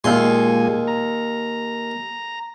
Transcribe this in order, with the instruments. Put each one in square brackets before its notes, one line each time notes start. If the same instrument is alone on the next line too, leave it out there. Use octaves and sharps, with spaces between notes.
[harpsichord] D#2 C6 [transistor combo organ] A#2 G#3 G#5
[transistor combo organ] A#5